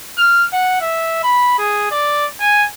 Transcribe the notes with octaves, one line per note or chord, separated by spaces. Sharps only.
F6
F#5
E5
B5
G#4
D5
G#5